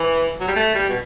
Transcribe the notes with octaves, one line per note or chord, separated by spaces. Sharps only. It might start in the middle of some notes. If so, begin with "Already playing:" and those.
Already playing: E3
F#3
G3
A3
G3
B2